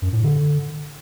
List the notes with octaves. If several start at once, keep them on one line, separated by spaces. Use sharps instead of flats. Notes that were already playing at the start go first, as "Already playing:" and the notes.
F#2
A2
D3